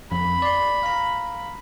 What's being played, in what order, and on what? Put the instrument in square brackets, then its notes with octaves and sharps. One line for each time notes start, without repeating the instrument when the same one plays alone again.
[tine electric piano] F2 [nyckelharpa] B5
[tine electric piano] D5 C6
F5 A#5